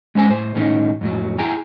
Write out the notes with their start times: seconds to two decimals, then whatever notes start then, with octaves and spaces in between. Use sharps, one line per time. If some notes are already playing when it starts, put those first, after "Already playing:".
0.15 G#3 C#4 C5 G#5
0.29 A2 C5
0.55 A2 D#3 G3 B3 C#4 D#4
1.01 F2 A2 F#3
1.38 E4 G#4 G5 G#5 A#5